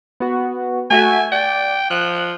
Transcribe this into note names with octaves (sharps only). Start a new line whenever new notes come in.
B3 F#4
A3 F#4 E5 G#5
D5 G5
F3 F#6